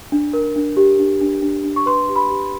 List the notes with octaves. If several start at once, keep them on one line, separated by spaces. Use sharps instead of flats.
D4
A#4
D4
G4
D4
D4
D4
D4
C#6
B4 C6
G4
B5
G4